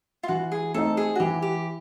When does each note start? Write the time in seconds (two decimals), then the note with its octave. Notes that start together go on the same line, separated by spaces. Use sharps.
0.23 F4
0.28 E3 F#4
0.52 G#4
0.74 A3 C4 D#4 A4
0.97 G#4
1.16 F#4
1.20 E3 G4
1.42 G4